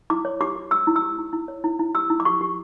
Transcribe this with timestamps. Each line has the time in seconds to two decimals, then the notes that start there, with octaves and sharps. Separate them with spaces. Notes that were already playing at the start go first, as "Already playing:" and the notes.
0.10 E4 D6
0.25 C#5
0.41 G4 D6
0.56 G4
0.71 G4 E6
0.87 E4
0.96 E6
1.02 G4
1.18 E4
1.33 E4
1.48 C#5
1.64 E4
1.79 E4
1.95 G4 E6
2.10 E4
2.20 D6
2.25 G4 C#6
2.41 G4